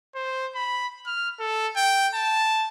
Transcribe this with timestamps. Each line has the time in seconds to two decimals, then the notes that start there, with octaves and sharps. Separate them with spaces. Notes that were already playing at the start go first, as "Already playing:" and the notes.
0.15 C5
0.55 B5
1.06 F6
1.40 A4
1.76 G5
2.14 A5